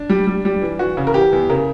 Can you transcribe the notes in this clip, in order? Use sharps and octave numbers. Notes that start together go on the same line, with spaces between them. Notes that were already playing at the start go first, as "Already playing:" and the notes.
Already playing: D4
G3
G3
G3
E3
E3 F#4
C#3
A#4
E3 G4
E2
C#3 A#4